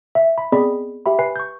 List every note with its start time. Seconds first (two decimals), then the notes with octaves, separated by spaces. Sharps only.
0.15 E5
0.38 B5
0.52 B3 C4 G#4 D5 D#5 B5
1.06 G4 E5 B5
1.19 B4 G#5 B5 C7
1.36 C#6 G6